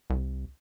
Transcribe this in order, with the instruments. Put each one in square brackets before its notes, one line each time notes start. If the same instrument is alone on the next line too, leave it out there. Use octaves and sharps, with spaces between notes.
[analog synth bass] C2